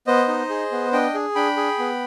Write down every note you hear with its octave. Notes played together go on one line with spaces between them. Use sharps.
B3 C5 D#5
D#4
G#4
B3
D4 D#5 G5
G#4
D4 G5 B5
G#4
B3